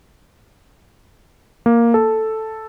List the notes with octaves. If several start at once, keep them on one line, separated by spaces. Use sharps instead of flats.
A#3
A4